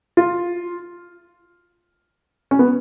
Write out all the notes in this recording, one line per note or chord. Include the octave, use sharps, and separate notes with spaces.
F4
C#4
B3